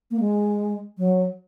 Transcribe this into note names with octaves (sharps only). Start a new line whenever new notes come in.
A#3
G#3
F#3